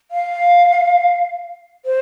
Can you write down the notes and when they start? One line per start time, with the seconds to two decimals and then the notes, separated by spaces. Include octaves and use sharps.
0.11 F5
1.85 C5